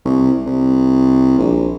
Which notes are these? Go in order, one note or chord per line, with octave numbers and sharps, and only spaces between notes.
C2
C2
A#1